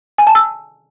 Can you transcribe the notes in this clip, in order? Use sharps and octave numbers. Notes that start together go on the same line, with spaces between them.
G#5
A5
E6